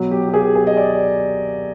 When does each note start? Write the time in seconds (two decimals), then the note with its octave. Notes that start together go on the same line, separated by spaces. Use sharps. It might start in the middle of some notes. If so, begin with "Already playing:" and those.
Already playing: B2 F#3
0.11 G4
0.29 G4
0.34 G#4
0.55 G#4
0.67 D#5
0.77 D5